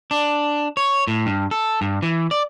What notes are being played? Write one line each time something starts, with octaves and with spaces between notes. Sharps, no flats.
D4
C#5
A2
G2
A4
G2
E3
D5